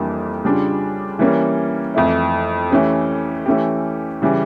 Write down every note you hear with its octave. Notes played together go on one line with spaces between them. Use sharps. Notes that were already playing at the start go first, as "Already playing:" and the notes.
Already playing: F2 E3 G3 A#3 D4
C#3 G3 D4 F4
E3 G3 A#3 C#4
F2 E3 A3 E4
E3 A3 C#4 G4
E3 A3 C#4 G4
C#3 E3 G3